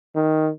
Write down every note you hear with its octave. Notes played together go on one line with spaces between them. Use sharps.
D#3